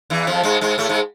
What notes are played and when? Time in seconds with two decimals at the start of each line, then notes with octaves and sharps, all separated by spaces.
0.10 E2 E3
0.27 F2 F3
0.43 G#2 G#3
0.61 G#2 G#3
0.78 A2 A3
0.89 G#2 G#3